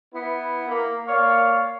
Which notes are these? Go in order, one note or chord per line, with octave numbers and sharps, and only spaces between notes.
B3 E4
A#3
A#3 C#5 D5 F5